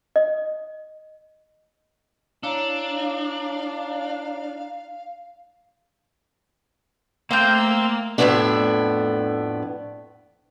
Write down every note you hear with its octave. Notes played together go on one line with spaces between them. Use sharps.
D#5
D4 E4 C#5 F5 A#5
A3 A#3 C4 F5 C6 E6 G6
F2 A2 D#3 A3 B3 D4